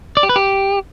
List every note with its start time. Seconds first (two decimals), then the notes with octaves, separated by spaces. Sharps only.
0.17 D5
0.23 G4
0.29 B4
0.36 G4